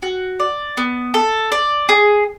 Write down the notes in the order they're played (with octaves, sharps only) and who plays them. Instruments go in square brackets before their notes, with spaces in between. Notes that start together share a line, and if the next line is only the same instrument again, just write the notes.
[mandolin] F#4
D5
B3
A4
D5
G#4